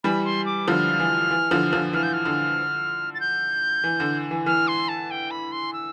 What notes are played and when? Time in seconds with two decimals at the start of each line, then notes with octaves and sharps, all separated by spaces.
0.04 E3 G3 B5
0.25 C6
0.46 D6
0.68 D3 F3 F6
0.99 E3
1.31 E3
1.51 D3 F3
1.73 D3 F3
1.93 E3 F6
2.03 G6
2.13 F6
2.25 D3
3.14 A6
3.20 G6
3.84 E3
4.00 D3
4.31 E3
4.46 E3 F6
4.68 C6
4.88 A5
5.11 G5
5.31 B5
5.52 C6
5.73 E6